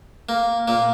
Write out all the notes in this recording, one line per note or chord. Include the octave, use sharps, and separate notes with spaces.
A#3
A#2 A#3